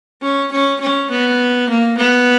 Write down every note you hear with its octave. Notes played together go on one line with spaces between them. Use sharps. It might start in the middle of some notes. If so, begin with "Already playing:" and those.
C#4
C#4
C#4
B3
A#3
B3